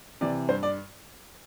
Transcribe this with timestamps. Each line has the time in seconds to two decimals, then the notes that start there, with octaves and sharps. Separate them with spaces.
0.21 C3 E3 D5
0.49 G2 C5
0.63 D5